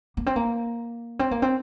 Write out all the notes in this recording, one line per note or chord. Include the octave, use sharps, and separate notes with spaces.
A#3
C4
A#3
C4
A#3
C4